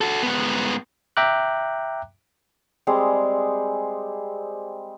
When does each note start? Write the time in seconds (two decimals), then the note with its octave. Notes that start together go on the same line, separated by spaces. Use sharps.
0.01 F#4 A4
0.23 G#2 B3
1.17 E5 G5 A#5 D6 F#6
2.87 G3 G#3 C4 G#4